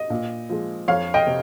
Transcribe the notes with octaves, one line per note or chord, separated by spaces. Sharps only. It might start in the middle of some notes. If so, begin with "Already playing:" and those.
Already playing: D#5
A#2
F3 G#3
F2 C#5 F5
D#5 G5
C3